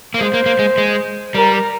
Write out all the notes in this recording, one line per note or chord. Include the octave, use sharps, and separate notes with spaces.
A#3
G#3 C5
A#3
A#3
G#3
G#3
G3 A#4